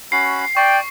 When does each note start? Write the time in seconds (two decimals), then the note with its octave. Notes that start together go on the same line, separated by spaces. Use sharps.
0.12 C#4 F#4 B5 C7
0.57 D5 G5 C#6